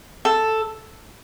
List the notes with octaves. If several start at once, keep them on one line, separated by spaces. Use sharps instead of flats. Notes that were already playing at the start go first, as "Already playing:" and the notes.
A4